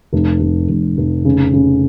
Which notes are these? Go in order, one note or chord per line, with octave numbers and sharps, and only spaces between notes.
F1
F1
F1
F1
C#3
C#3